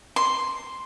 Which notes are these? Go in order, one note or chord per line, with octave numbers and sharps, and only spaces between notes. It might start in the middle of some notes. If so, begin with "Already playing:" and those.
C6